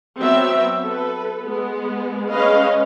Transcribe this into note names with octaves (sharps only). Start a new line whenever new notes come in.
F#3 B3 C4 E5
A4 B4
G#3 B3
G#3 C#4 B4 D#5 F5